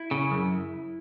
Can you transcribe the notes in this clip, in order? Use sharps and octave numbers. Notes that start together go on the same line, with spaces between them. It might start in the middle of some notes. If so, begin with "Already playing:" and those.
Already playing: E4
C#3
F#2